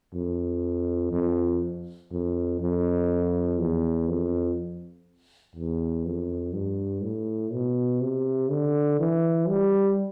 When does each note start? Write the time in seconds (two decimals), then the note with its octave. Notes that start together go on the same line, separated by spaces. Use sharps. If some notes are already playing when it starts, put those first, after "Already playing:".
0.14 F2
1.13 F2
2.11 F2
2.60 F2
3.59 E2
4.08 F2
5.55 E2
6.05 F2
6.53 G2
7.03 A2
7.53 B2
8.01 C3
8.50 D3
8.99 E3
9.48 G3